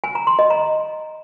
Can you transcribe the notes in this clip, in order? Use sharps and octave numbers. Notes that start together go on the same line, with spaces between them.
G#5
A#5
C6
D#5
A#5